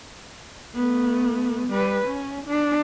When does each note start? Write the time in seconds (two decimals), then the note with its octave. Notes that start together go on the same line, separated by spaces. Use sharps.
0.75 A3 B3
1.68 G3 B4
2.07 C#4
2.47 D4